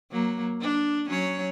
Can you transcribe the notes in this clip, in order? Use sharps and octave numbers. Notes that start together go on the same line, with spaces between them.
F#3 A#3
D4
F#3 C#4 C#5